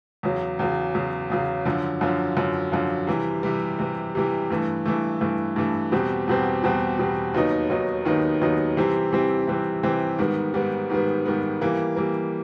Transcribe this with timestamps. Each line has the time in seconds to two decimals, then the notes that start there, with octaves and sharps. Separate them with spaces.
0.23 E2 C#3 F#3
0.59 E2 C#3 F#3
0.95 E2 C#3 F#3
1.30 E2 C#3 F#3
1.65 F#2 D3 F3
2.01 F#2 D3 F3
2.36 F#2 D3 F3
2.72 F#2 D3 F3
3.07 C3 E3 G3
3.43 C3 E3 G3
3.79 C3 E3 G3
4.15 C3 E3 G3
4.50 G2 E3 A3
4.86 G2 E3 A3
5.21 G2 E3 A3
5.56 G2 E3 A3
5.92 E2 B2 G3 C4
6.28 E2 B2 G3 C4
6.64 E2 B2 G3 C4
6.99 E2 B2 G3 C4
7.34 D#2 D#3 F#3 B3 D#4
7.70 D#2 D#3 F#3 B3 D#4
8.05 D#2 D#3 F#3 B3 D#4
8.41 D#2 D#3 F#3 B3 D#4
8.77 C3 E3 G3 C4
9.12 C3 E3 G3 C4
9.47 C3 E3 G3 C4
9.83 C3 E3 G3 C4
10.18 G#2 D#3 G3 B3
10.54 G#2 D#3 G3 B3
10.90 G#2 D#3 G3 B3
11.26 G#2 D#3 G3 B3
11.61 E3 G3 A#3
11.96 E3 G3 A#3